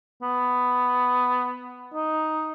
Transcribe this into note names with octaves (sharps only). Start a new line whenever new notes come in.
B3
D#4